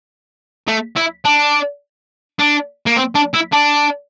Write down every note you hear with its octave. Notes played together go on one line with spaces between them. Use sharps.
A3
E4
D4
D4
A#3
C4
D4
E4
D4